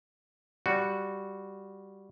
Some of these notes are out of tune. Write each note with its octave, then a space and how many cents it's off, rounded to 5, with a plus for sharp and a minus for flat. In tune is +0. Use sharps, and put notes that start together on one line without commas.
G3 +0 F#4 -5